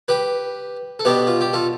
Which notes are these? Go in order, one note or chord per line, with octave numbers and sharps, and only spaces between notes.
G4 B4
A4
B2 B3 D4 G4 B4
F4
G4
F4 A4